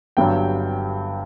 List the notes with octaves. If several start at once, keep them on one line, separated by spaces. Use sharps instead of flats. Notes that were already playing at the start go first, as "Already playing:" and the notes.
G1 G2 F#3 G5